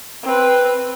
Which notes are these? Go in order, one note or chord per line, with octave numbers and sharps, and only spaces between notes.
C4 B4